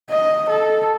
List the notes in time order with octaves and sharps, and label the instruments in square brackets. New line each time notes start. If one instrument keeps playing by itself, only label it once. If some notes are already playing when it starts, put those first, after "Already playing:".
[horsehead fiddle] D#5
A4